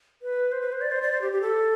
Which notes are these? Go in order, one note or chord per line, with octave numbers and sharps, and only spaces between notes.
B4
C5
B4
C5
D5
C5
D5
C5
G4
G4
A4